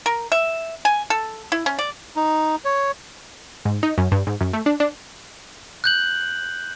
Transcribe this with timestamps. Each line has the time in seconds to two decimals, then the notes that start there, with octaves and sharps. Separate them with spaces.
0.06 A#4
0.32 E5
0.85 G#5
1.10 A4
1.52 E4
1.66 C#4
1.79 D5
2.16 D#4
2.65 C#5
3.65 G#2
3.83 D#4
3.98 F#2
4.12 G2
4.27 G#2
4.41 F#2
4.53 A3
4.66 D4
4.80 D4
5.84 F#6 G6 F#7